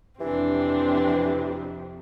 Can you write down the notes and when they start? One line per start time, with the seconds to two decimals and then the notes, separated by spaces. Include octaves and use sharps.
0.20 F2 C3 E3 C4 D4 G4